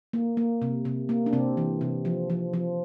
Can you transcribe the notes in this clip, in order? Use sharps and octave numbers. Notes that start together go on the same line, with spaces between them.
A#3
A#3
C3
C3
A#3
D4
C3 C4
E3
C3
F3
F3
F3